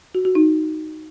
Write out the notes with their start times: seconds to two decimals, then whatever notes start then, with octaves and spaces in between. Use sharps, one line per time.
0.15 F#4
0.25 F#4
0.35 D#4